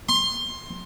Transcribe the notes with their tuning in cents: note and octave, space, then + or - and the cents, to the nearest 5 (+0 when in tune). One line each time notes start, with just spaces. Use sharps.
C6 +20